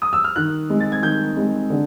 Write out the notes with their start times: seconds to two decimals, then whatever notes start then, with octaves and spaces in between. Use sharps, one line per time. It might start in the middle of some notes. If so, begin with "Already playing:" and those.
0.02 D#6
0.13 E6
0.24 F6
0.36 D#3 F#6
0.70 G#3 C4
0.80 A6
0.92 G#6
1.02 D#3 G6
1.37 G#3 C4
1.70 D3